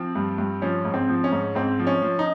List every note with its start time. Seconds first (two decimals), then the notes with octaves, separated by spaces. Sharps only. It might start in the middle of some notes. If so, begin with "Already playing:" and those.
Already playing: F3 C4
0.15 G2
0.38 G2
0.62 F3 C#4
0.85 G#2
0.94 C4
1.09 F3
1.24 C#4
1.32 G#2
1.55 G#2 C4
1.80 F3
1.87 C#4
2.02 F3
2.19 D#4